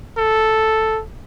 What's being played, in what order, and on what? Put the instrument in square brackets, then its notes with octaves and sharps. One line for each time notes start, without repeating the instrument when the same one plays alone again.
[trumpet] A4